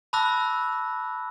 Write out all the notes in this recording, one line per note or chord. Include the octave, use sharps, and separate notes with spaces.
A5 B5 D6 E6 F#6 A#6